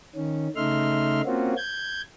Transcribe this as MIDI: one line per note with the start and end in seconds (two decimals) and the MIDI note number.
0.15 0.48 51
0.15 0.48 61
0.56 1.21 49
0.56 1.21 57
0.56 1.21 63
0.56 1.21 76
0.56 1.21 84
0.56 1.21 89
1.26 1.54 58
1.26 1.54 60
1.26 1.54 61
1.26 1.54 65
1.26 1.54 66
1.57 2.01 91
1.57 2.01 92